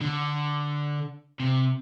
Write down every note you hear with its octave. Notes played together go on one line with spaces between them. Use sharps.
D3
C3